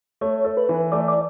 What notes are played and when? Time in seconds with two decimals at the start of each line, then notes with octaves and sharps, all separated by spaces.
0.21 A3 C#5
0.45 A4
0.57 B4
0.69 E3
0.92 A3 D5
1.08 D5